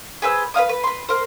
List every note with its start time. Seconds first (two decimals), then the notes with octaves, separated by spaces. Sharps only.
0.22 G#4 B4 C5 E6
0.54 B4 D#5 F5 D#6
0.69 B4
0.84 B4 C6
1.09 A#4 C5